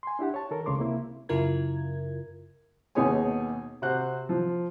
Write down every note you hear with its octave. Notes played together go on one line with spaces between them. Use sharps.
G#5 C6
D4 E4 G4 F#5
C#5 A5
D#3 A4 A#4
C#2 C#3 G#3 C#5 C6 D6
C3 A#3 E4
F#2 C#3 E4 F4 A#4 G#6
D#2 B2 D#4 G#4 C#5 G#5
C3 F#4 C5 F#6
F3